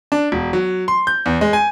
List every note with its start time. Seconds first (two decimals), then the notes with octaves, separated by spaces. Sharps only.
0.12 D4
0.32 E1
0.53 F#3
0.88 C6
1.07 G6
1.26 E2
1.41 G#3
1.53 G#5